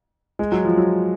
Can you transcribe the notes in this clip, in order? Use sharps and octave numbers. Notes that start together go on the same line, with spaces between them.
G#3
F#3
F3
F#3